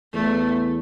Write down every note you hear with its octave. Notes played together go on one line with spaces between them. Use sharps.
E2 A3